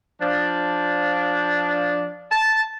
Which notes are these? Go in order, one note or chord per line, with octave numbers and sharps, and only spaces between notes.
F3 D4
A5